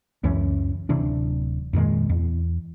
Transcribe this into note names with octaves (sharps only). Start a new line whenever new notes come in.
C#2 F#2 E3 C#4
D1 C3 E3 D4
F2 A#2 D#3 G#3
E2